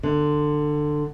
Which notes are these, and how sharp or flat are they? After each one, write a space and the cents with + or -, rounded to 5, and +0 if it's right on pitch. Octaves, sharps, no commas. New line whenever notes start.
D3 +20